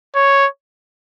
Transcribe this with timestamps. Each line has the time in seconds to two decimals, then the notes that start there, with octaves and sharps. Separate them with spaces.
0.15 C#5